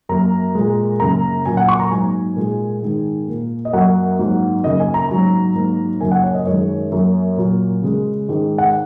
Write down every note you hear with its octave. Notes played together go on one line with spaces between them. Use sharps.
F#2 F#3 A#3 A#5
A#2 G#3
F#2 C#3 A#3 A#5
A#2 F#3 A#3 G#5
F#5
C#6
A#5
G#2 F#3 A#3 G#5
A#2 G#3
G#2 D#3 G#3
A#2 A#3
D#5
F#2 F#3 A#3 F#5
G#2 F#3 A#3
F#2 C#3 A#3 D#5
G#5
A#5
G#2 F#3 A#3
G#2 F#3 A#3
F#2 C#3 F#3 A#3 G#5
F#5
C#5
D#5
F#2 D#3 G#3 C#5
F#2 F#3 A#3
A#2 F#3 A#3
C#3 G#3
G#2 D#3 G#3
F#5